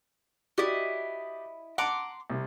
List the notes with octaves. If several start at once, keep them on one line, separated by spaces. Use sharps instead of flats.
E4 F#4 G4 D5 D#5
F#5 A5 A#5 C6 D6
C2 C3